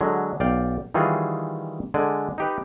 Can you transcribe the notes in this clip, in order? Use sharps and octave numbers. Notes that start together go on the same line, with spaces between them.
D3 F#3 G#3
B1 D5 F5 G5
D#3 E3 G3 F4 F#4 G#4
D3 G#3 D5 G#5
D#4 G4 B4